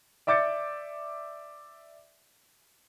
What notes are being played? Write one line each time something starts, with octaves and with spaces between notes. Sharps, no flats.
D5 E5 D6 G6 A6 C#7